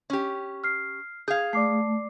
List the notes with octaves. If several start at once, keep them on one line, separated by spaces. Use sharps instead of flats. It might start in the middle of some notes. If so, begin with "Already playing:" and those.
C#4 G4
F6 C7
G#4 F5 G6 G#6
A3 D5 D6 C7